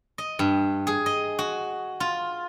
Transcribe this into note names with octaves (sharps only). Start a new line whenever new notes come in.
D#5
G2
G#4
D#5
F#4
F4